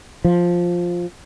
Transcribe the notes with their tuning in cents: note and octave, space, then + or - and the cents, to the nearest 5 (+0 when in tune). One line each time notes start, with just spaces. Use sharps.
F3 +5